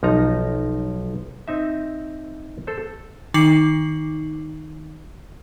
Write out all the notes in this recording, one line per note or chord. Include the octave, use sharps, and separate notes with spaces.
B1 F3 D#4 A#5
C4 D#4 E5
A4 C5
D#3 D#4 D6 C7 F#7